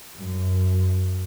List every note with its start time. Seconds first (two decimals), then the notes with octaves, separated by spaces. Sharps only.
0.17 F#2